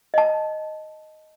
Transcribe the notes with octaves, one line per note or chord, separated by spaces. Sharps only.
D#5 A5